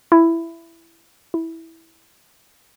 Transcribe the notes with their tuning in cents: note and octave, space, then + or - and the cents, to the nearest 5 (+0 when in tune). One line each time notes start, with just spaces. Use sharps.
E4 +10
E4 -10